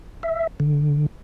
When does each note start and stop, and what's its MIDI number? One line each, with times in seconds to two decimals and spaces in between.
0.23 0.47 76
0.60 1.06 50